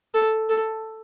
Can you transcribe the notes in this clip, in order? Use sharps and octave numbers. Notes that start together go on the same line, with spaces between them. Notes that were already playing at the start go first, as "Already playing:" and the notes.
A4
A4